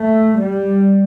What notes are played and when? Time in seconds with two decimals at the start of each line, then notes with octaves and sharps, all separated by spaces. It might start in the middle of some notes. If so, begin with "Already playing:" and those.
Already playing: A3
0.39 G3